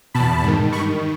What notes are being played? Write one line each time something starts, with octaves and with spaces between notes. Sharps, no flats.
E2 B2 A5 B5
G#2 D#3
G2 D#3 B5 C#6